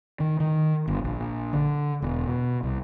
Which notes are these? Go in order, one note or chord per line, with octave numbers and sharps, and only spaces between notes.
D#3
D#3
G1
A#1
D3
E1
B2
C2